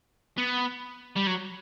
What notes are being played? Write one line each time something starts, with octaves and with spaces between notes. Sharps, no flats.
B3
G3
F#3